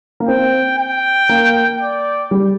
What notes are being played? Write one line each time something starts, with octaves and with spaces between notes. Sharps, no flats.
A#3
C4 G5
G5
A#3
D5
G3